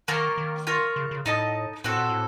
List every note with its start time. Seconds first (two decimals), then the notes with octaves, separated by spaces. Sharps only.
0.08 D#3 A#3 F4 A#4 C#5
0.38 D#3
0.67 F4 A#4 C#5
0.96 C#3
1.11 C#3
1.26 A2 D#4 A4 D#5 A5
1.84 A2 C4 F#4 A4
1.97 A#2
2.09 A2